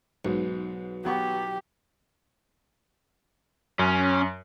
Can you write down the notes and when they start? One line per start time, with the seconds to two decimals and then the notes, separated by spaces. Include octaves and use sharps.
0.25 B1 G#2
1.05 F#3 B3 G4 C#6
3.79 F#2 C#4